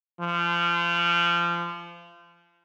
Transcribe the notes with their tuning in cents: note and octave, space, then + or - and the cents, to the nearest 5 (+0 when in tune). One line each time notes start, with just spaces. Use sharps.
F3 -25